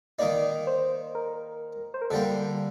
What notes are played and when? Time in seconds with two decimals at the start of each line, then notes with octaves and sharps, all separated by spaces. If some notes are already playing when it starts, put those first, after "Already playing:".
0.19 D#3 A#3 D#4 D5
0.67 C5
1.15 A#4
1.94 C5
2.02 A#4
2.10 D3 G3 A#3 A4